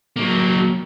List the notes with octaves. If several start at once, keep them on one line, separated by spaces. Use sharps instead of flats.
F#3 A#3